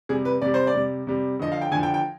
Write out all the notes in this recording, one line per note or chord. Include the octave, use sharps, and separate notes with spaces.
C3 G3 G#4
B4
C3 G3 D5
C5
D5
C3 G3
C3 G3
D3 F3 D#5
F5
G5
D3 F3 G#5
G5
G5